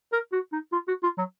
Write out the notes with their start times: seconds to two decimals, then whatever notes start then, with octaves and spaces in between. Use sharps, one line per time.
0.13 A#4
0.32 F#4
0.52 D#4
0.72 F4
0.88 F#4
1.03 F4
1.18 F#3